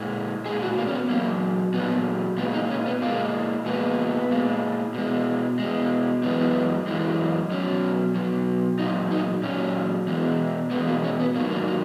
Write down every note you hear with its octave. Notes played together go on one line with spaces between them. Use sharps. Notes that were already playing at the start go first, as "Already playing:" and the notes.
Already playing: A#2 G#3
A#2 G#3 G#4
F#4
A#3
C#4
B3
A#2 F#3 A#3
A#2 F#3 B3
A#2 G#3 B3
D#4
C#4
B3
A#2 G#3 A#3
A#2 G#3 B3
A#2 G#3
B2 G#3
B2 G#3
F#2 E3 G#3 B3
F#2 E3 G#3
B2 F#3 C#4
B2 F#3
A#2 F#3 D#4
D#4
A#2 F#3 C#4
E2 B2 G#3
E2 B2 G#3 B3
A#3
C#4
B3
G#2 D#3 F#3 A#3
A#3
A#3